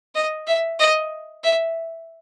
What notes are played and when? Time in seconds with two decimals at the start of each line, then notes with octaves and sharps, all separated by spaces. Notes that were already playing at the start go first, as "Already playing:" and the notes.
0.15 D#5
0.47 E5
0.79 D#5
1.44 E5